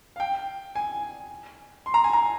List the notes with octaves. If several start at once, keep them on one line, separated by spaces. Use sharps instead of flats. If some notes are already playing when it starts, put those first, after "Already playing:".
F5
G5
G#5
C6
A#5
G#5
A#5